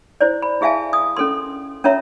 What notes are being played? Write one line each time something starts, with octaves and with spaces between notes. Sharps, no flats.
E4 C5 D5
B5
E4 G#4 E5 F5 G#5 A5
D#6
C#4 A4 A#4 C6
C#4 F4 A#4 C#5 E5 A#5